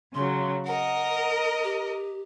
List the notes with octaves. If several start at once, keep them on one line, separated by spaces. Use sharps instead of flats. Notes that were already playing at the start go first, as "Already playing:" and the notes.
C#3 F#3 C6
A#4 D#5 F#5
G4